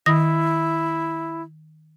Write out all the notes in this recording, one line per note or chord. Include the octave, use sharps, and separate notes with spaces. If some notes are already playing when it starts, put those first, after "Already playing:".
D#3 E4 D#6 A#6